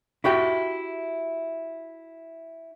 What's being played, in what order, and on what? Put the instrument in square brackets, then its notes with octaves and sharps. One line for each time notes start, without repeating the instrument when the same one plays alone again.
[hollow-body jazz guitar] E4 F#4 G4 G5